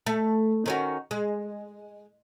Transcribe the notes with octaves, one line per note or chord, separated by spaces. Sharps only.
A3
D#3 C#4 F#4
G#3